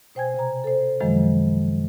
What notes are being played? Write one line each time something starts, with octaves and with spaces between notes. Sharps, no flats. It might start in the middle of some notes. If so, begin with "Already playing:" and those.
B2 C5 G5 G#5 G#6
C3 C5 A#5
A4 C5
F#2 C3 D#3 F3 F#3 G#3